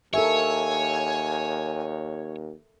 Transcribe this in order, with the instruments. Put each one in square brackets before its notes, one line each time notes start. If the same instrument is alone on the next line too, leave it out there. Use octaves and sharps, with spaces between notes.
[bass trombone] D#2 [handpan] A4 A#4 E5 [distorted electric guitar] C#5 [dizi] G#5